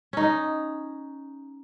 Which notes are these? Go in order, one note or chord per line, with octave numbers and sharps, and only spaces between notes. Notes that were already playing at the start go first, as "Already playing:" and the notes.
C#4 D#4